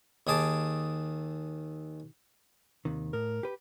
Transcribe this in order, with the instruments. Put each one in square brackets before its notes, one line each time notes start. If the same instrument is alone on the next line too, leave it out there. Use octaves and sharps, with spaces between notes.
[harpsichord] D#2 D#3 G#4 A5 D6
[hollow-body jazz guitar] D#2 C3 D#3
[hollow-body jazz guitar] A2 [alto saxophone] A#4
[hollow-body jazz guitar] G4 B4